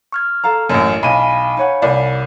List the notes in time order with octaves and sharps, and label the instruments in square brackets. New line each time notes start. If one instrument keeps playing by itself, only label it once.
[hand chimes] C#6 F6 G#6
[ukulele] A4 F5 A#5
[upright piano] A1 F#2 [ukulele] D4 E4 D#5
[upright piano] B1 D#7 [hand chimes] F5 G#5 B5
[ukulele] D#4 C#5 F#5
[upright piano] C2 D5